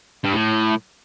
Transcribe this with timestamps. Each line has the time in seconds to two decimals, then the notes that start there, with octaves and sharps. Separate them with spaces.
0.25 G2
0.33 A2